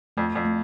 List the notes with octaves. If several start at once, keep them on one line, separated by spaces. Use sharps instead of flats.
F2 A3
F2
A3